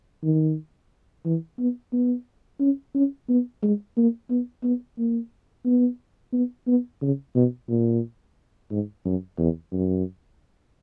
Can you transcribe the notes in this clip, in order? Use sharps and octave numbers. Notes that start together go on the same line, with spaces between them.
D#3
E3
B3
B3
C#4
C#4
B3
G#3
A#3
B3
B3
A#3
B3
B3
B3
C#3
B2
A#2
G#2
F#2
E2
F#2